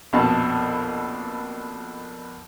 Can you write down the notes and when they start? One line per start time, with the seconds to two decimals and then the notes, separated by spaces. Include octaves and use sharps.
0.13 A#1 F2 B2 A5